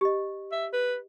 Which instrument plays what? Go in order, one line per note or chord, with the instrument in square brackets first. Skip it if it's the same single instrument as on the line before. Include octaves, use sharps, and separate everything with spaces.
[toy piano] G4 D#5
[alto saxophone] E5
B4